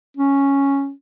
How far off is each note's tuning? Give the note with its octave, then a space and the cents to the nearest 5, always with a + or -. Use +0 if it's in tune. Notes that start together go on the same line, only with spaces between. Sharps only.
C#4 +0